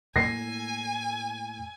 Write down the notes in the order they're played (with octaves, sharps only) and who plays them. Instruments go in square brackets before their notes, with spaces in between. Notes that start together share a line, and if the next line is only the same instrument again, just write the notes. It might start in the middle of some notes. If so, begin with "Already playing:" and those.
[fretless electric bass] A2 A3 A#3 [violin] G#5 [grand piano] A#6 C7